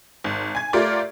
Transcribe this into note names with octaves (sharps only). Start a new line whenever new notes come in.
G#1
G#5 G#6
A3 F4 G4 A#4 D5